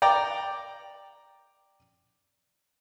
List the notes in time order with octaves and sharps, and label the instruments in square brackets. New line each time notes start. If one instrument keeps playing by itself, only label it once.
[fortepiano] D5 G5 A#5